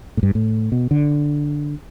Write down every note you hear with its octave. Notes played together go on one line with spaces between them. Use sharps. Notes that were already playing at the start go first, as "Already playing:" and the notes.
A2
G2
A2
B2
D3